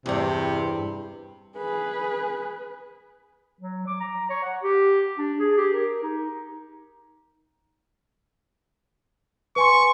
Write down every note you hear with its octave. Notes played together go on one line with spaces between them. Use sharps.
E2 G2 C3
G#4 B4
F#3
D6
A#5
C#5
F#5
G4
D4
G#4
G4
A#4
D#4
B4 G#5 C6 C#6